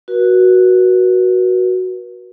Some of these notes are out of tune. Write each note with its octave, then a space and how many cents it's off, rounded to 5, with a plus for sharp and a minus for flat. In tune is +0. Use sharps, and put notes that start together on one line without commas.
F#4 +0 B4 -45